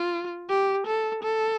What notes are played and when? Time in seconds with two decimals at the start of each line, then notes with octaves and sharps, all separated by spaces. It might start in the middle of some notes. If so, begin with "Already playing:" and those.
Already playing: F4
0.50 G4
0.87 A4
1.23 A4